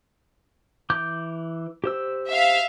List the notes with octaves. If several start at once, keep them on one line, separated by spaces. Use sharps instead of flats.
E3 D6 G6
G4 C5 E6
E5 F5